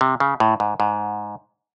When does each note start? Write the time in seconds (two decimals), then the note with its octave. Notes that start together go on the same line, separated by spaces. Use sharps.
0.01 C3
0.20 C#3
0.40 A2
0.60 G#2
0.80 G#2